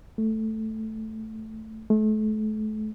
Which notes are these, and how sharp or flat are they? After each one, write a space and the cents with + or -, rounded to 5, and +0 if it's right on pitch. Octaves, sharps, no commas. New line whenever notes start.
A3 +0
A3 -35